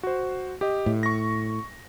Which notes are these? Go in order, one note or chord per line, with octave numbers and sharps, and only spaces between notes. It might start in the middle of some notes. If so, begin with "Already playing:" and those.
F#4 C5
G4 D#5
A2
C#6 A#6